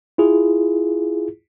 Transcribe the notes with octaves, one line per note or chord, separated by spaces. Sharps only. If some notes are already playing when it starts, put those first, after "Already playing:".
E4 F4 G#4